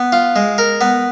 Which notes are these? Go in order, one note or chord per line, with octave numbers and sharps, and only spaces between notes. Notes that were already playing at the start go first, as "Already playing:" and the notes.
Already playing: B3
F4
G#3
A#4
B3